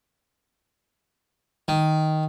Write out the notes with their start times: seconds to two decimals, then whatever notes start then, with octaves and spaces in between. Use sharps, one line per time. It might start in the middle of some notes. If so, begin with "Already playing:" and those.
1.68 D#3